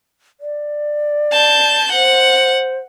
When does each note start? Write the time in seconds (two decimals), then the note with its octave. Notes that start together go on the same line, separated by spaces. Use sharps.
0.40 D5
1.32 A5 G6
1.92 C5 F#5